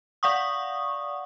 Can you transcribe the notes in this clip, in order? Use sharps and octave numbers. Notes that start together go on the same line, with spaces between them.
D5 F5 F#5 C#6 D#6